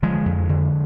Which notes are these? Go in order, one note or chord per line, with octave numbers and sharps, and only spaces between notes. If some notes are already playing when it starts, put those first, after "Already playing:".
D3 F3 G#3
F2
D3